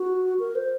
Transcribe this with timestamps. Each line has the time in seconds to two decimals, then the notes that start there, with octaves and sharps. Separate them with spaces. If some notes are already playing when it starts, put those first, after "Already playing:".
Already playing: F#4
0.39 A#4
0.55 C5